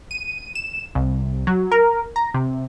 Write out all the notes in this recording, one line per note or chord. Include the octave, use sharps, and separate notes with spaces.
D#7
E7
C2
F#3
A#4
A#5
C3